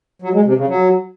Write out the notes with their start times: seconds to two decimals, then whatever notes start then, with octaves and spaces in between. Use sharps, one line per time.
0.22 F#3
0.33 G#3
0.45 C3
0.56 C#3
0.68 F#3